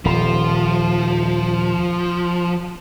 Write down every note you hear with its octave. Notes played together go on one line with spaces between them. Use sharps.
D#1 F3